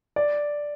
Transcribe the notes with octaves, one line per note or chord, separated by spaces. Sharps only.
D5